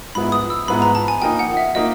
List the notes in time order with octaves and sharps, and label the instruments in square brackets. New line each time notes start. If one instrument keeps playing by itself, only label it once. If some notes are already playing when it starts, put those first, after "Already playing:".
[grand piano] G#2 F3 G#3 B3 E4 [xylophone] B5
[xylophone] D#6
E6
[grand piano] G#2 F3 G#3 B3 E4 [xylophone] B5
[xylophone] A#5
A5
G#5
[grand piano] F3 A#3 D#4 [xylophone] G5
[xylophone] F#5
E5
[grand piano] F3 A#3 D#4 [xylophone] D#5